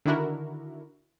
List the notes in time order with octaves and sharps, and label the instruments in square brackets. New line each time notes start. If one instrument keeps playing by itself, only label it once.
[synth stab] D3 D#3 D4 E4 F#4 A#4